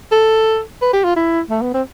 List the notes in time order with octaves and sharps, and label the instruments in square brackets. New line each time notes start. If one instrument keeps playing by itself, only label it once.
[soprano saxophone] A4
B4
G4
F4
E4
A3
B3
C4